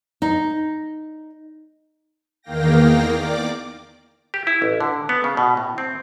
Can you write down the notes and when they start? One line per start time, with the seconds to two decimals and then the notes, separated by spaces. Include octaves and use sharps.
0.22 D#4
2.43 E2 D#3 A#3 F5 G5 A#6
3.10 D5 D6
4.34 G4
4.47 E4
4.62 A1
4.80 D3
5.09 B3
5.24 C#3
5.37 B2
5.57 A2
5.78 C4